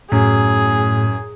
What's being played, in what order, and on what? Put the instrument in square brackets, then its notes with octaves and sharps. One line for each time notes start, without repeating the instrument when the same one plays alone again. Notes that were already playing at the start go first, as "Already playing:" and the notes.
[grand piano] F#2 [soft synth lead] A2 [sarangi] G#4